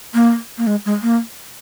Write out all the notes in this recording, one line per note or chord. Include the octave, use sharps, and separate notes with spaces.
A#3
A#3
G#3
G#3
A#3